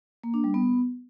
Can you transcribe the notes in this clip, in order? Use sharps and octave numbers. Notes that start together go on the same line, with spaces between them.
A#3
D4
G3
B3